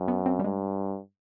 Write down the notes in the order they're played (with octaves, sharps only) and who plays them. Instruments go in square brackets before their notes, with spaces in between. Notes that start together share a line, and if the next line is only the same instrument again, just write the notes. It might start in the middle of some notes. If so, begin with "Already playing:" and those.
Already playing: [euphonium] F#2
[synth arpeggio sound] B3
C4
G3
[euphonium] G2 [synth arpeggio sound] G#3